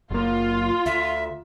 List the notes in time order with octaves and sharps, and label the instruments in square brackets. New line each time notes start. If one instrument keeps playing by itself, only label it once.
[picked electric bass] F#1 A#3 [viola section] F4
[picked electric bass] D2 [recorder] E5